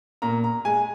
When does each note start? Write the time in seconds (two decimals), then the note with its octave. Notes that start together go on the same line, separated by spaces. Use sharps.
0.22 A#2 A#5
0.44 A#5
0.65 G#3 G#5